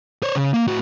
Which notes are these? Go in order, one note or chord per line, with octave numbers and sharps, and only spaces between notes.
C5 C#5
C#3
A#3
A2 F#4